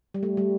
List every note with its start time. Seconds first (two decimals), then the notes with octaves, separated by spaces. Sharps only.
0.14 G3
0.23 A3
0.37 G3